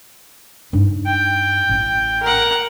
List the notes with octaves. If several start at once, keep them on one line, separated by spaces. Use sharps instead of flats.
G2 D#4
G5
A1
A#4 F#5